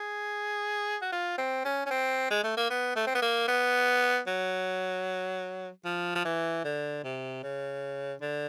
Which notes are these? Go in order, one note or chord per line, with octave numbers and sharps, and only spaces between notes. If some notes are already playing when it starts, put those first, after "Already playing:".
Already playing: G#4
F#4
F4
C4
C#4
C#4
C4
G#3
A3
A#3
B3
A3
C4
B3
A#3
B3
F#3
F3
F3
E3
D3
C3
C#3
D3